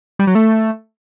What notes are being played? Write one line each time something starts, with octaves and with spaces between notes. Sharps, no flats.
G3
F#3
A3